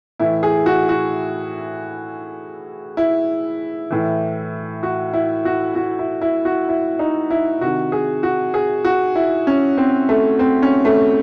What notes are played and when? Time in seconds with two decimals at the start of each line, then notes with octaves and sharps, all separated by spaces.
0.19 A2 E3 E4
0.43 G#4
0.66 F#4
0.89 F#4
2.97 E4
3.90 A2 E3
4.83 F#4
5.13 E4
5.45 F#4
5.75 F#4
5.99 E4
6.21 E4
6.45 F#4
6.69 E4
6.99 D#4
7.30 E4
7.61 C3 D#3 F#4
7.92 G#4
8.23 F#4
8.54 G#4
8.85 F#4
9.15 E4
9.47 C#4
9.77 C4
10.09 A3
10.39 C4
10.62 C#4
10.85 A3